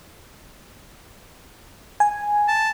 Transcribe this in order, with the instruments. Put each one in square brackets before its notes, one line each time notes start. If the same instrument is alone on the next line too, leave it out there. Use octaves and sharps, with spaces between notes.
[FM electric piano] G#5
[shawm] A5